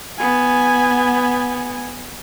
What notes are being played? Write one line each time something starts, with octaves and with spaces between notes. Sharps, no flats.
B3 G#5